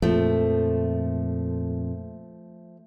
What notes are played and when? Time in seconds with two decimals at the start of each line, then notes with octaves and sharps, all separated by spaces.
0.02 F2 A#2 F3 A3